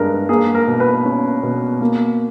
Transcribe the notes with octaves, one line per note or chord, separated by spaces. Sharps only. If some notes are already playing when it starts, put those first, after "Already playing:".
Already playing: G2 G#3 A#4
A#3 G#4
A#4
B2
B4
C#4
B2
A#3